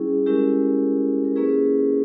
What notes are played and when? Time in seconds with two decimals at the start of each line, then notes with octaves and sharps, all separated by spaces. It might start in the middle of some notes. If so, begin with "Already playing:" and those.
Already playing: G3 C#4 E4 G#4
0.26 G#3 C#4 E4 G4 A#4
1.25 A#4
1.36 A#3 C#4 E4 G#4 B4